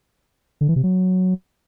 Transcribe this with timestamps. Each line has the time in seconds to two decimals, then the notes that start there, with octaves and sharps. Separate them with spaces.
0.61 D3
0.68 E3
0.76 C3
0.83 F#3